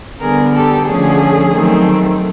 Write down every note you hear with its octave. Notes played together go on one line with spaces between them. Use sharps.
D3 G3 B3 G#4 A#4
G4 A4
D3 F3 A3 C#4 G#4
D#3 F#3 A3 C4